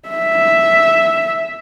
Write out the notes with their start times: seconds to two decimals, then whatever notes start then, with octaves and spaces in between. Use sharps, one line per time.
0.09 E5